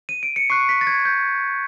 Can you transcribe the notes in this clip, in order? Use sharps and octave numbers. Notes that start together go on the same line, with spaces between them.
D#7
D7
C#7
C#6 F#6 C7
B6
A6
G#6
G6